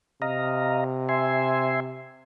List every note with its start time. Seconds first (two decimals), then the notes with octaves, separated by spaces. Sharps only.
0.22 C3 D#5 F5 A#5
1.09 E5 G#5 C6